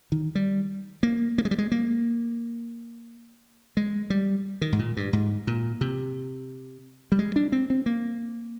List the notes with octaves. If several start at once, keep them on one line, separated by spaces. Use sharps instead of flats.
D#3
G3
A#3
A#3
G#3
G3
G#3
A#3
G#3
G3
D#3
G#2
A#2
G2
G#2
A#2
C3
G3
G#3
D4
C4
C4
A#3